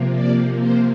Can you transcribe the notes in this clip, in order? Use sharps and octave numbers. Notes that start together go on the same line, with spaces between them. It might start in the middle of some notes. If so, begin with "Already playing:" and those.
Already playing: C3 F3 A#3
D5
C5